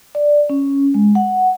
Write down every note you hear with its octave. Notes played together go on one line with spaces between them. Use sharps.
D5
C#4
G#3
F#5